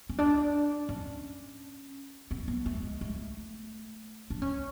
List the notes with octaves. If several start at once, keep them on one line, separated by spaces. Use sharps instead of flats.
C#4
D4
C#4
C4
B3
A3
G#3
A3
D4
C#4